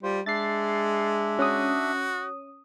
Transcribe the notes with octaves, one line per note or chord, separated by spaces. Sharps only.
G3 F4 C5
G#3 D4 E5 A6 C7
C#4 F#4 D#6